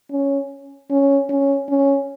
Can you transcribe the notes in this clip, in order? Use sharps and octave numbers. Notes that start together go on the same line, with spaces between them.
C#4
C#4
C#4
C#4